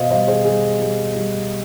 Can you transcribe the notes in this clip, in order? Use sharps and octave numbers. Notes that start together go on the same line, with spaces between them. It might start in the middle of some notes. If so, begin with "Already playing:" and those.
Already playing: B2 C5 D#5 F5
G3 C5 D#5
G#4 C5
G3 G#4
G3
G3